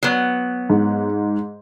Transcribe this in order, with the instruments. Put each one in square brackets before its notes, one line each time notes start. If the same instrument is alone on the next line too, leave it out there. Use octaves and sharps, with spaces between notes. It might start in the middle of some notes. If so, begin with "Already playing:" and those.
[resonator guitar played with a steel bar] F#3 B3
[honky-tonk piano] G#2